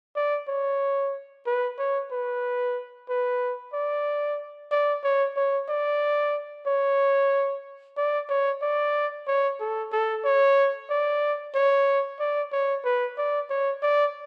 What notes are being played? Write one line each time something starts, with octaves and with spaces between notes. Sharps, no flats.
D5
C#5
B4
C#5
B4
B4
D5
D5
C#5
C#5
D5
C#5
D5
C#5
D5
C#5
A4
A4
C#5
D5
C#5
D5
C#5
B4
D5
C#5
D5